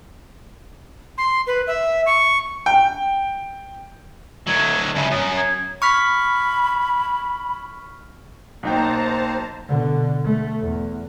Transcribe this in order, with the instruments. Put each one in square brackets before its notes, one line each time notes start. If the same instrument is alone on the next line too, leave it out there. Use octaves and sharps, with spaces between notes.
[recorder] C6
B4
E5
C#6
[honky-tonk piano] G5
[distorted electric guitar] D2 F#3 [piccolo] G#6
[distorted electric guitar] G2 C#3 [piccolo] E5
[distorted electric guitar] F#2 [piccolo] D#6
[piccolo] G#6
[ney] B5 [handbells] C#6 F6 B6
[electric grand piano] B1 D#4 G5 [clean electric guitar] A#3 F#4 [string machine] C5 A5 A#5
[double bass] B2 D3
A3
E2